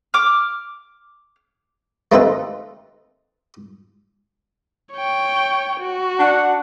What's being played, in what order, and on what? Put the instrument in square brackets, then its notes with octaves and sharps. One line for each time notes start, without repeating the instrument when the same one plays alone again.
[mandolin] D6 F6
[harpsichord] A3 A#3 C4 D#4 A4 B4
[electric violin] C#5 G5
F#4
[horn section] D4 F#5